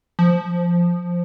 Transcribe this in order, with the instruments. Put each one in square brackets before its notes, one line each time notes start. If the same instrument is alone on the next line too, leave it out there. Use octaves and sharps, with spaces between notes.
[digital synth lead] F3